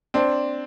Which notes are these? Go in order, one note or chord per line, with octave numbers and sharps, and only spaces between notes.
C4 D4